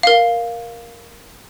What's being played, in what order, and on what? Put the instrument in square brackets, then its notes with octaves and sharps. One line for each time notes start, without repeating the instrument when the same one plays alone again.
[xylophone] A#4 F5